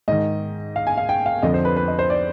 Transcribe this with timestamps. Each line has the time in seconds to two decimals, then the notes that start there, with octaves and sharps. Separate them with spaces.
0.08 G#2 D#3 D#5
0.76 F5
0.87 G#5
0.97 F5
1.09 G5
1.26 F5
1.43 F2 D3 F3 D#5
1.54 C5
1.65 B4
1.76 B4
1.88 D#5
1.99 C5
2.10 D5